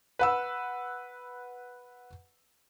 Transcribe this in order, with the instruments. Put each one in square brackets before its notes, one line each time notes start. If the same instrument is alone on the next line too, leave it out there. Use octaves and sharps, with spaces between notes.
[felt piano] B4 F#5 E6